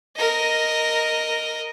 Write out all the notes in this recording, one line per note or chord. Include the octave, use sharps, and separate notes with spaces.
A#4 D#5